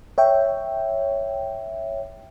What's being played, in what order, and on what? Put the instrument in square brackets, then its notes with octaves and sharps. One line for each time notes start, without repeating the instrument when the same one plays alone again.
[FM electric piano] C#5 E5 G5